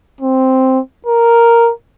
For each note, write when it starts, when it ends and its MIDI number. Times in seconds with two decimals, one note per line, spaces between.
0.21 0.79 60
1.06 1.71 70